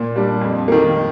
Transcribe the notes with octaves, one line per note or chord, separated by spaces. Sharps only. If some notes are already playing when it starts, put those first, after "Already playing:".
Already playing: A#2
G3 D4
F2
D#3 A#3